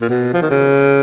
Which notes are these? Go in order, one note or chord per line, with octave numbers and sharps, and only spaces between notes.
A#2
B2
F3
D#3
C#3